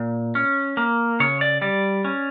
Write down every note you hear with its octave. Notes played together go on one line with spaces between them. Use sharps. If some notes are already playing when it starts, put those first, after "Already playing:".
Already playing: A#2
C#4
A#3
C#3 C#5
D5
G3 D5
C#4